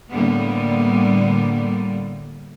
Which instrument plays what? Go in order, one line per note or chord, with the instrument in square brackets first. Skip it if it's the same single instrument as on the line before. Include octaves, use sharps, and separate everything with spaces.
[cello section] A2 D3 G3 A#3 B3